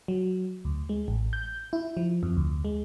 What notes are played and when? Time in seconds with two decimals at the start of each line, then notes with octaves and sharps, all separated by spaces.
0.08 F#3
0.65 D2
0.89 G#3
1.08 A1
1.33 G6
1.73 E4
1.97 F3
2.23 F2
2.37 D2
2.65 G#3